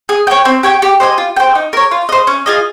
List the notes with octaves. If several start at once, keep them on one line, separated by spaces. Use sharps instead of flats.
G#4
C#5 G5
C4
G4 C#5 G5
G4
C5 D#5 G#5
F4
C5 G5
D#4
A#4 C#5
F4
C5 D#5
C#4
F4 G#4 D#5